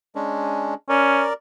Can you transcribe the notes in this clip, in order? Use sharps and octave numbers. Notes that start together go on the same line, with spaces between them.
G#3 C#4 D4
C#4 A#4 D5